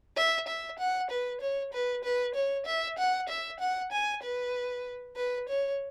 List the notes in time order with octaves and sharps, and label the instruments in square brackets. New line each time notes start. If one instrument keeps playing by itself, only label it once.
[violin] E5
E5
F#5
B4
C#5
B4
B4
C#5
E5
F#5
E5
F#5
G#5
B4
B4
C#5